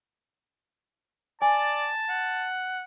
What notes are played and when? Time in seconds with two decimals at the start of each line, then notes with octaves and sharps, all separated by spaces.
1.42 D5 G#5 A5
2.09 F#5